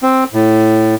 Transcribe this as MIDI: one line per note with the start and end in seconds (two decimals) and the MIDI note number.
0.03 0.24 60
0.34 0.95 45